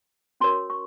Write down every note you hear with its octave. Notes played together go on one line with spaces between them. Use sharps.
C#4 F#4 A#4 C#5 C6
C#6